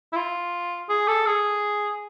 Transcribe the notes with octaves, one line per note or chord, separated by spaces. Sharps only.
E4
F4
G#4
A4
G#4